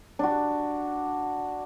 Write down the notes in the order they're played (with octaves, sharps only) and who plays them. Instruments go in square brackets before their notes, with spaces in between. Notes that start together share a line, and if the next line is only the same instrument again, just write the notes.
[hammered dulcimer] D4 F#4